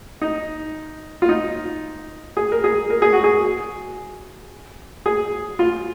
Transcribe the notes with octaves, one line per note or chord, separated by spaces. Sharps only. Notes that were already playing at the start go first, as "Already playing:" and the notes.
D#4
F4
D#4
G#4
A#4
G#4
A#4
G#4
F#4
G#4
G#4
F4